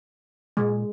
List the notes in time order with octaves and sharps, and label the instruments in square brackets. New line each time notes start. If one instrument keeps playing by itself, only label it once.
[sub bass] A#2 [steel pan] G#3